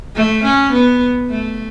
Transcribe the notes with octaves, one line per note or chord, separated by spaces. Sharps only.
A3
C#4
B3
A3